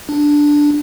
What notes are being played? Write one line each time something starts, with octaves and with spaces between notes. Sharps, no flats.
D4